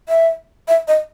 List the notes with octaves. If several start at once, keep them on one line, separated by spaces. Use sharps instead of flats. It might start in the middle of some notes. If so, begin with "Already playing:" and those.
E5
E5
D#5